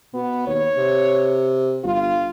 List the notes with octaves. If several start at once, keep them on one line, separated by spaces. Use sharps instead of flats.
B2 B3
D#2 C#5
C3
G1 F4